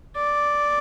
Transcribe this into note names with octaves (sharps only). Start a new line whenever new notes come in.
D5